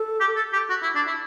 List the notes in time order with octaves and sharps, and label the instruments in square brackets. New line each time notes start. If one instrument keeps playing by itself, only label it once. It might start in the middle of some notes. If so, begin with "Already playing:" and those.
Already playing: [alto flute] A4
[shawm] G4
A4
G4
F#4
E4
D4
E4